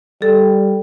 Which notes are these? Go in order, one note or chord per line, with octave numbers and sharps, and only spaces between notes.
G3 A4